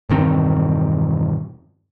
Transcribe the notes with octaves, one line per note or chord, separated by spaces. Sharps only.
E1 G2 D#3 C4